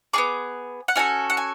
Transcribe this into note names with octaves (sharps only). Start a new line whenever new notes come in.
B3 D4 G#4 D6
F#5
C#4 F#4 A4 G#5
F#5
G#5